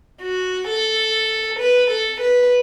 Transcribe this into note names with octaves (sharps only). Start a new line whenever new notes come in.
F#4
A4
B4
A4
B4